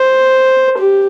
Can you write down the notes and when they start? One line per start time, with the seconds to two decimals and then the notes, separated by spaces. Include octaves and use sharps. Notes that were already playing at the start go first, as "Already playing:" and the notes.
Already playing: C5
0.78 G4